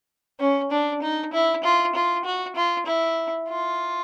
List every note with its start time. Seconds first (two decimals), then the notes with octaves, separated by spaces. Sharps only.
0.40 C#4
0.71 D4
1.02 D#4
1.33 E4
1.64 F4
1.95 F4
2.25 F#4
2.56 F4
2.86 E4
3.48 F4